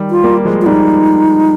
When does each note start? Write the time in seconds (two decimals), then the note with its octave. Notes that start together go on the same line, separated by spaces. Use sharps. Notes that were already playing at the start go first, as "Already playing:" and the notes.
Already playing: D#3 G3
0.11 F4
0.24 G3 A#3
0.45 F3 G#3
0.61 F4
0.66 G3 A#3 D#4